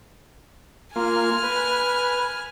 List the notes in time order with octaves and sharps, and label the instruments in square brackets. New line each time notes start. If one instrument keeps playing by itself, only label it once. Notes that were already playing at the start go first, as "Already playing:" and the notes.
[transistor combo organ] A#3 F4 [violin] G#5 F6
[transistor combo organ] B4